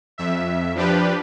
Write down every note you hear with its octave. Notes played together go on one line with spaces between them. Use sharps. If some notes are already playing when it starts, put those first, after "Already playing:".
F2 E5
F3 D4 G4 B4